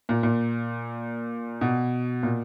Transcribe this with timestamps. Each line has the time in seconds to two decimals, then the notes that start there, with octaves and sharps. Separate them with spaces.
0.09 A#2
0.23 A#2
1.61 B2
2.23 A#2